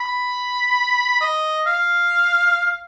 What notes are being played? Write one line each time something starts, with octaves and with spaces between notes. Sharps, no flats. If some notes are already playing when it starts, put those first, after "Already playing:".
B5
D#5
F5